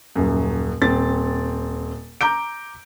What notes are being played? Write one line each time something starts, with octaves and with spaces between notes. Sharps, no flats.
D#1 F#2
D#1 C4 A6
A#5 D6 G6 D7